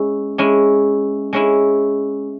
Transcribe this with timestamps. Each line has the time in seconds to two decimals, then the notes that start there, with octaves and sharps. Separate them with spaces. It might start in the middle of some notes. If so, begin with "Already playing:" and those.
Already playing: G#3 C#4 E4
0.38 G#3 C#4 E4
1.33 G#3 C#4 E4